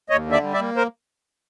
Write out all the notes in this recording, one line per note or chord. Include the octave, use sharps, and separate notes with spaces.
D#2 C#5 D#5
D3
D5 E5
G3
D5 E5
A#3
A#4 C5